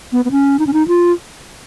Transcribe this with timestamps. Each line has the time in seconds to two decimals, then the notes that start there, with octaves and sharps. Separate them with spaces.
0.12 B3
0.25 B3
0.31 C#4
0.59 D#4
0.67 C#4
0.73 D#4
0.88 F4